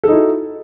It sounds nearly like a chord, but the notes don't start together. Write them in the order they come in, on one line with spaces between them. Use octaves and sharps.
A4 D#4 E4 F#4